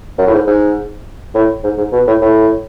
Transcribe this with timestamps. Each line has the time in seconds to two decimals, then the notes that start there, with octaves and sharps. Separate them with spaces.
0.18 F#2
0.27 A2
0.33 G#2
0.47 G#2
1.35 A2
1.64 G#2
1.78 G#2
1.92 B2
2.07 A2
2.22 A2